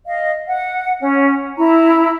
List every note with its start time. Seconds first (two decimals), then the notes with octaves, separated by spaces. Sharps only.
0.07 D#5 F5
0.47 F#5
1.00 C#4
1.57 E4 A#5